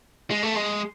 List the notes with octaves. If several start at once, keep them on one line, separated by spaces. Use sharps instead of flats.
G#3
A3
G#3